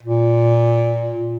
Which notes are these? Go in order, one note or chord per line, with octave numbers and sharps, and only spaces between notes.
A#2